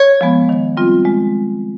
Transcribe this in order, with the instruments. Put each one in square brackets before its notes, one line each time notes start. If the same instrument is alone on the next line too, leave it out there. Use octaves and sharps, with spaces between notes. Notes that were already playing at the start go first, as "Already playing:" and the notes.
Already playing: [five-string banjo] C#5
[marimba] F3 G#3 B3
D#3
G3 C4 F4
G#3